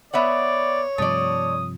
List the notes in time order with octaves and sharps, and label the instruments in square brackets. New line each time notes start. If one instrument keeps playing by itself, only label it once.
[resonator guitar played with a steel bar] B3 E5 F#5 [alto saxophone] C#5 [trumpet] D5
[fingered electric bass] G2 C3 F3 [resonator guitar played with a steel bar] A3 D5 [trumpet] D#6